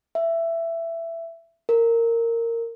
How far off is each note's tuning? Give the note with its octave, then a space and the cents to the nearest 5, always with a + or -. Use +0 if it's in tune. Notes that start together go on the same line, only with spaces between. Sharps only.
E5 +15
A#4 -15